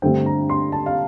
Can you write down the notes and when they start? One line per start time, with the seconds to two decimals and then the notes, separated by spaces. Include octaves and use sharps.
0.02 G2 D3 A3 C4 G5
0.26 A#5
0.50 C6
0.72 A5
0.86 F5